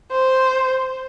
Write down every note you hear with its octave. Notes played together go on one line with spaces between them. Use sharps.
C5